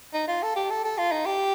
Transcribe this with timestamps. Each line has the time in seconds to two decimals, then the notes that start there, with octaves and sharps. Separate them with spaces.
0.13 D#4
0.28 F4
0.42 A4
0.56 G4
0.70 A4
0.84 A4
0.98 F4
1.12 D#4
1.26 G4